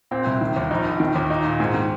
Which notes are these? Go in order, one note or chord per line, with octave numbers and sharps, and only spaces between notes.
A#2 C4
C2
D#3
D#2
A#1 D#4
A#1
D#3
D#2
A#2 D#4
A#2
G#2
D#3